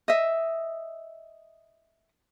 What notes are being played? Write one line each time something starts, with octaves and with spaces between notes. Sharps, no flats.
D#5 E5